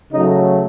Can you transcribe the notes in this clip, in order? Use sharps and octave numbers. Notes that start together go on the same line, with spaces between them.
C#3 F#3 A3 D#4